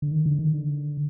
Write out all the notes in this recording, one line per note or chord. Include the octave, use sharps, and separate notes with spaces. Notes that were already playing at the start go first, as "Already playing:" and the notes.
D3
D#3
D3
D#3
D3